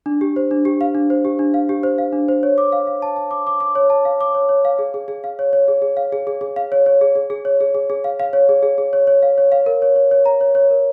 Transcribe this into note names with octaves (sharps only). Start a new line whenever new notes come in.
D4
G4
C5
D4
G4
F5
D4
C5
G4
D4
F5
G4
C5
F5
D4
C5
C#5
D6
F5
F5
A5
A5
D6
D6
D6
C#5
A5
F5
D6
C#5
C#5
F5
G#4
G#4
G#4
F5
C#5
C#5
G#4
G#4
F5
G#4
G#4
G#4
F5
C#5
C#5
G#4
G#4
G#4
C#5
G#4
G#4
G#4
F5
F5
C#5
G#4
G#4
G#4
C#5
C#5
F5
C#5
F5
A#4
C#5
C#5
C#5
A#5
C#5
C#5
A#4